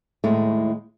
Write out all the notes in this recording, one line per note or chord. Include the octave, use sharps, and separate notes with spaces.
D#2 A2 G#3 A3 E4 C#5